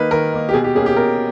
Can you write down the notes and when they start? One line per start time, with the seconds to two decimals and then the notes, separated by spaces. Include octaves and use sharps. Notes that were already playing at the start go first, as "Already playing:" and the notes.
Already playing: D#3 A#3 D#4 B4
0.11 D#3 A#4
0.32 A#3 D#4
0.49 G4
0.54 B2 G#4
0.64 G4
0.75 A#3 C#4 G#4
0.86 G4
0.96 B2 A#4